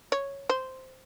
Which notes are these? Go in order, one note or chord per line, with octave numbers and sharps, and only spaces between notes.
C#5
C5